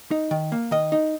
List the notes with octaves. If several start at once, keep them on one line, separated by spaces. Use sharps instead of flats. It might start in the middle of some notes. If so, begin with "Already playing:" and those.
D#4
D#3
A#3
D#3 D#5
D#4